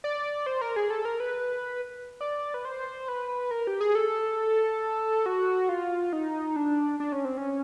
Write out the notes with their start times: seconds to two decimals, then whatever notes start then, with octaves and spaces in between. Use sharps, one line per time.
0.04 D5
0.46 C5
0.61 A#4
0.76 G#4
0.90 A4
1.05 A#4
1.20 B4
2.21 D5
2.54 B4
2.65 C5
3.08 B4
3.51 A#4
3.67 G4
3.81 G#4
3.95 A4
5.26 F#4
5.69 F4
6.13 D#4
6.56 D4
7.00 D4
7.12 C#4
7.25 C4
7.37 C#4